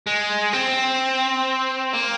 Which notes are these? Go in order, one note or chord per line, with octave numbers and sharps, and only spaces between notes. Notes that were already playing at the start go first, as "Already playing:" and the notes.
G#3
C4
A#3